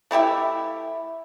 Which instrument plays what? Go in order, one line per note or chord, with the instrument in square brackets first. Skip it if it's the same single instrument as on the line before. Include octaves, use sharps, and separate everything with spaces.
[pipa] A3 E4 G4 E5